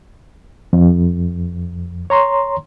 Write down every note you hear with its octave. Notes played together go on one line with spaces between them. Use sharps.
F2
C#5 A#5 C6